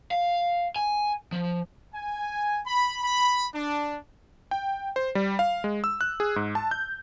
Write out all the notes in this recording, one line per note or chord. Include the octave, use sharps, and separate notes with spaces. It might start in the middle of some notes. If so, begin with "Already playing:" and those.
F5
G#5
F3
G#5
B5
B5
D4
G5
C5
G3
F5
G#3
E6
F#6
G#4
G#2
A5
G6